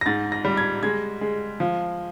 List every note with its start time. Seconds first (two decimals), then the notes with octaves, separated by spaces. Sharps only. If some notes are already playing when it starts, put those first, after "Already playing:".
0.01 A#6
0.06 G#2 A6
0.32 A#6
0.45 G3
0.57 G#6
0.83 G#3 G#6
1.21 G#3
1.60 F3